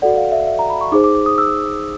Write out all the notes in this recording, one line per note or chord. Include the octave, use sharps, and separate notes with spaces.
F#4 A4 D5 F#5
F5
E5
E5
A#5
B5
C#6
D#4 G#4 C5 D6
D6
D6
D#6
E6